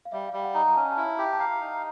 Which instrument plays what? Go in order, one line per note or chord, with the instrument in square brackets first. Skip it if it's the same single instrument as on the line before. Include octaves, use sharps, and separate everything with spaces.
[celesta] F5
[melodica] G3 [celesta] E5
[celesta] F5
[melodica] G3
[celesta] F#5
[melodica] D#4
[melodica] C#4 [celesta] A5
[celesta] A5
[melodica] E4 [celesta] A#5
[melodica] G4
[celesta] A5
[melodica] F5 [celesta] A#5
[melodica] D#4